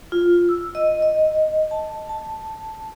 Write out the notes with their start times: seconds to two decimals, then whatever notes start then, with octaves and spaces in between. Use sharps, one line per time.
0.12 F4
0.49 E6
0.75 D#5
1.02 D#5
1.71 A5
2.09 A5